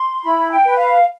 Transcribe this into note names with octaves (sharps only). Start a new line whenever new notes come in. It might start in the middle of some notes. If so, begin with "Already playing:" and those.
Already playing: C6
E4 B5
G5
B4
F5